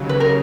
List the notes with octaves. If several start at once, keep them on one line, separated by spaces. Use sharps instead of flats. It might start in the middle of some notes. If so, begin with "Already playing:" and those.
Already playing: D#2 C#3 F#3
B4
A#4